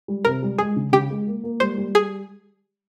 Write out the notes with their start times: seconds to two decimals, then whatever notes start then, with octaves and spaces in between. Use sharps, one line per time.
0.08 G3
0.25 C3 A#4
0.43 G3
0.58 G#3 G#4
0.76 C#3
0.92 C#3 G4
1.10 G#3
1.27 A#3
1.44 A#3
1.60 G3 C5
1.78 G3
1.95 G#4